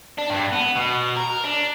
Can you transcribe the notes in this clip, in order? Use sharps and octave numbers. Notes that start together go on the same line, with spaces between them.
D4
G2
B3
B2
A#4
D4